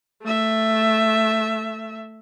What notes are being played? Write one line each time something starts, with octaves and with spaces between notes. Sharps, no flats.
A3 E5